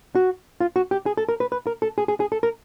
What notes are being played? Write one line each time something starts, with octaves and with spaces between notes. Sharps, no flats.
F#4
F4
F#4
G4
G#4
A4
A#4
B4
B4
A#4
A4
G#4
G#4
G#4
A4
A#4